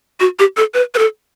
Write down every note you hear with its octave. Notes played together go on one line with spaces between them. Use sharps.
F#4
G4
A4
B4
B4
A4